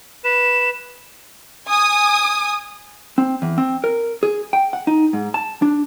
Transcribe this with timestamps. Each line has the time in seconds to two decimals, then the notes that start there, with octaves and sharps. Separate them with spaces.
0.25 B4 E7
1.68 G#5 D#6
3.18 C4
3.42 E2
3.58 C4
3.84 A#4
4.23 G#4
4.53 G5
4.73 F#5
4.87 D#4
5.13 G#2
5.34 A5
5.62 D4